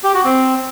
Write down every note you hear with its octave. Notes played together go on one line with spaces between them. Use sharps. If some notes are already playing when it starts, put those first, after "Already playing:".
G4
F#4
C4